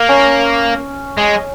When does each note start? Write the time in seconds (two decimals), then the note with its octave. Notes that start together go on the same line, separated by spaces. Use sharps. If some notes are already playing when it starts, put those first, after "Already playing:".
Already playing: A#3
0.09 C#4
1.17 G#3